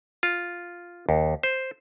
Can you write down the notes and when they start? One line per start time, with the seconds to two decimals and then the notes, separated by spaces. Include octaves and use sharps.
0.23 F4
1.09 D#2
1.43 C5